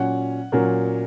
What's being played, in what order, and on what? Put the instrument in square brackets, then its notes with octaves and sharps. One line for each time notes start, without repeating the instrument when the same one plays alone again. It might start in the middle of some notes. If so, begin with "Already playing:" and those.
Already playing: [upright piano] A#2 F#3 C#4 [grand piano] F#5
[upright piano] A#2 F#3 C#4 [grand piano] A#4